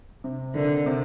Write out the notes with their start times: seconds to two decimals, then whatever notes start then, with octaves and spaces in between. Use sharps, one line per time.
0.24 C3
0.55 D3 D#3
0.86 C3